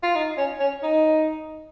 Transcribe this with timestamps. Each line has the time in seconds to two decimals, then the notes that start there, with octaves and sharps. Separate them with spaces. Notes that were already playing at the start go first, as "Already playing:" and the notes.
0.03 F4
0.15 D#4
0.38 C#4
0.60 C#4
0.83 D#4